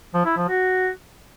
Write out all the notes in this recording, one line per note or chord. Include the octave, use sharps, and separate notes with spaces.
F3
E4
F3
F#4